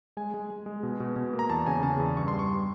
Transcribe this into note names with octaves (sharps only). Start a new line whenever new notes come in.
G#3 G#5
G#3
G#3
G#3
B2
B2
B2
A#3
A#5
E2 A5
C#3 G#5
C#3 A5
E2
G2 C#6
C6
G3
C#6
G3